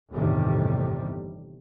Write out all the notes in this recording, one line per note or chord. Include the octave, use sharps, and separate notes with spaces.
G1 E2 A2 C3 D#3 G3